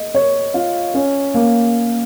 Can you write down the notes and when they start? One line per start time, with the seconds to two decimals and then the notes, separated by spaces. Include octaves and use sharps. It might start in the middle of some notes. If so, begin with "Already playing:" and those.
Already playing: D#5
0.15 C#5
0.54 F4
0.94 C#4
1.34 A#3